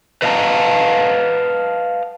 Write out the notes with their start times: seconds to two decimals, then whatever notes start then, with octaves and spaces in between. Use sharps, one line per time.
0.22 B4 D#5 F5 F#5 A5 A#5